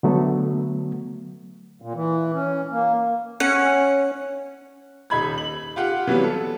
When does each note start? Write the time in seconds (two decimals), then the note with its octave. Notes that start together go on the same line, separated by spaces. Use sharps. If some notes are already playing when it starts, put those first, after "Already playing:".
0.03 D3 F#3 A3 B3
1.82 A#2
1.95 E3
2.34 C#4
2.72 A#3
3.40 C#4 F#5
5.10 D#1 D#4 B5 G#6
5.38 F#7
5.76 F4 G4 F#5
6.07 E3 F#3 G3 B3
6.24 A4